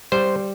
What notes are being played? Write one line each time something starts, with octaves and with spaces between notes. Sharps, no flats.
G3 C5